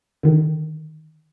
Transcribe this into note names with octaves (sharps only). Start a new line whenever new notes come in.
D3 D#3